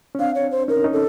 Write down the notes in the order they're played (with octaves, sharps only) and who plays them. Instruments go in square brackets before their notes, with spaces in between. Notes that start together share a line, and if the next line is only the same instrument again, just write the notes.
[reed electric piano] C#4
[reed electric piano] C4 D4 [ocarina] F5
[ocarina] C#5
C5
[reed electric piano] C#4 D#4 [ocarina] A#4
[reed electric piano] C#4 D#4
[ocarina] A4